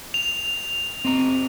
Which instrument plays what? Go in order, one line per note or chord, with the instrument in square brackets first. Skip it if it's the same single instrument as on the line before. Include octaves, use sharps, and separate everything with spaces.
[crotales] F7
[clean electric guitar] C4 D#5 A#5